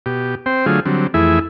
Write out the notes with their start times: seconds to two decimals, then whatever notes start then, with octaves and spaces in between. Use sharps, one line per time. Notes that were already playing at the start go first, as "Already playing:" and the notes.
0.06 B2 G4
0.46 C4 C5 G5
0.66 D3 F#3 A3 F4 G#4
0.86 D3 F#3 G3 C4
1.14 F2 E3 A3 E4 G#4 E5